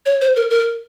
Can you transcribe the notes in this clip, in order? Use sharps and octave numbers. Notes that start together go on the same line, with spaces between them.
C#5
C5
A#4
A#4